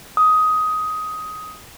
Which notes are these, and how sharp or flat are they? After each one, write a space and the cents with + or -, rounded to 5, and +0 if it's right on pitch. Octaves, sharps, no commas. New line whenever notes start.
D#6 +15